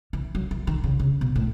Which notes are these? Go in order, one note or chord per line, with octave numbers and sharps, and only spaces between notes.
E3
F#3
E3
D#3
C#3
C#3
B2
A2